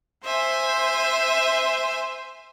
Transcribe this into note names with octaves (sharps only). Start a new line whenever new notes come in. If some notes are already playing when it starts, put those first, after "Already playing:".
C5 E5 G#5